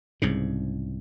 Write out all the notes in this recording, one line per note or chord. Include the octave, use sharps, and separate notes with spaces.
C2 G#2 C#3